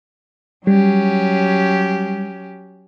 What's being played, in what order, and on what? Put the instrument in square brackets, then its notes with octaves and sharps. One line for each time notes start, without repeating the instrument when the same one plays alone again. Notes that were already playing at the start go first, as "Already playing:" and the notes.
[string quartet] F#3 C#4 G4 [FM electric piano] G3